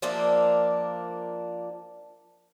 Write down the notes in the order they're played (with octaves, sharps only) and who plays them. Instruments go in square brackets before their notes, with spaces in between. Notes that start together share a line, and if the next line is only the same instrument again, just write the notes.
[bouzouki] F3 A#3 D4 E5